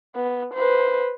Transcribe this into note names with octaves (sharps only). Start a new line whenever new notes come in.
B3
B4 C5